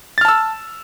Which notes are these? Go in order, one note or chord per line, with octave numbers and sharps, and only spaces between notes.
A5 E6 F6 A6